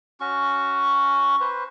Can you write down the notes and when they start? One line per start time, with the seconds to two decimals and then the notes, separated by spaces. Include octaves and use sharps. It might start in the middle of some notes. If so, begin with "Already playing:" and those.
0.20 C#4 F#4 C#6
1.41 B4 C5